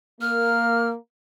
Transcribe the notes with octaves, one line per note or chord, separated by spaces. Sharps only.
A#3 F6